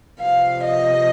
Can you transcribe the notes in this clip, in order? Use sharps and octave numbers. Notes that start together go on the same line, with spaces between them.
C3 F3 F5
D#5